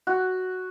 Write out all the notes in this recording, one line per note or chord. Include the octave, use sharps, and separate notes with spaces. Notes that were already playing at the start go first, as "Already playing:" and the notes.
F#4